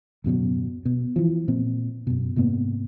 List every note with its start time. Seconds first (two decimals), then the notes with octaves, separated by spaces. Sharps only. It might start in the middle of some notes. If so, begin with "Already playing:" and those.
0.24 D1 F#2 B2 F#3
0.85 B2
1.16 E3 F3
1.48 A#2 C4
2.07 F#2 B2
2.36 G#2 C3 A#3 B3